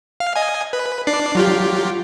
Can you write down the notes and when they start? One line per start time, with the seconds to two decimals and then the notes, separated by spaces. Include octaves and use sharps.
0.20 F5
0.36 D#5 G#5
0.73 B4
1.07 D4 D5 C7
1.35 F#3 F4 G4